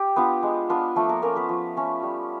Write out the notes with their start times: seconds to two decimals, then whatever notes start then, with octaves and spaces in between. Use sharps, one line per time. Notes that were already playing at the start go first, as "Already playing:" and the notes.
Already playing: G4
0.16 B3 D4 F4
0.43 G#3
0.70 B3 D4 F4
0.96 F3 A3 A4
1.09 A#3 A#4
1.22 A3 A#3 C#4 A#4
1.36 B3 B4
1.49 F3
1.76 A3 C#4
2.03 G3